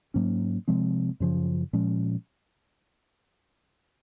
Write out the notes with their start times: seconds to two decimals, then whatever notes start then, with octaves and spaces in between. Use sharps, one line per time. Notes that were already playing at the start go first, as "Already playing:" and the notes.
0.14 G#2 F#3 A#3 C#4
0.68 C3 F3 G#3 C4
1.20 F#2 C#3 F3
1.73 A#2 F3 G#3 C#4